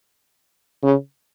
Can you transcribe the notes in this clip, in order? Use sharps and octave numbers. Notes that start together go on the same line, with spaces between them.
C#3